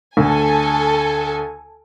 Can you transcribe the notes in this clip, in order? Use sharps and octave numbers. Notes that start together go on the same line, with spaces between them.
D2 A4 G#5